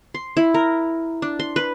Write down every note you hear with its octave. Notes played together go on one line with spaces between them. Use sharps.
C6
E4
A#4
D4
C6
B4